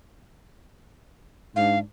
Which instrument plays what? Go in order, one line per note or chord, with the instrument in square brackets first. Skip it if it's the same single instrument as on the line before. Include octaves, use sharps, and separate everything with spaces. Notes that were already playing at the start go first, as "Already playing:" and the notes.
[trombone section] G#2 D4 [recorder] F5